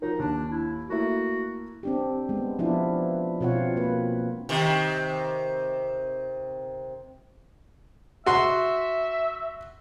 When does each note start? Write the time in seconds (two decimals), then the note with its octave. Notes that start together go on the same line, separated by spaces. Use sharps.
0.02 F3 D#4 F#4 A#4
0.19 D#2 D4
0.51 E4
0.90 A3 A#3 E4 F#4
1.83 C4 D4 G4
2.29 G#3 B3
2.59 F3 B3 D4 E4 F4
3.41 B2 C4 F4 C#5 F#5
3.76 A#3 B4
4.49 C3 D#3
8.26 F#4 E5 C6